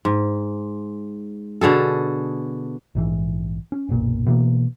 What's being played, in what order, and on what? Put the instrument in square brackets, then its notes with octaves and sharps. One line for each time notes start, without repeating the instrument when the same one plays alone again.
[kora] G#2
B2 D3 G#4 A4
[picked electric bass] A#1 G#2 E3
C#4
F#1 B1 A#2
B2 E3 A#3